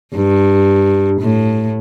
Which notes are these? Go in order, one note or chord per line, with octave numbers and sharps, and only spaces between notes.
G2
A2